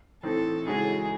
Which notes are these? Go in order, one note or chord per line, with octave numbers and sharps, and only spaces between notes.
A2 E3 C4 D#4 A4
C#3 E3 G#3 D#4 F#4 G#4